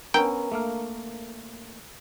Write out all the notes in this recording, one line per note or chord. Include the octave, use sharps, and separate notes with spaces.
B3 C#4 D4 A#4 G5 A#5
A3 A#3 F5